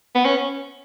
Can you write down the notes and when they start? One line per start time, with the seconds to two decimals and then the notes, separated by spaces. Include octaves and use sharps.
0.15 B3
0.25 C#4